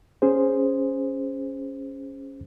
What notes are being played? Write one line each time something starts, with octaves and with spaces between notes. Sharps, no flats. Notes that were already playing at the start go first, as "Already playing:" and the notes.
C#4 G#4 C5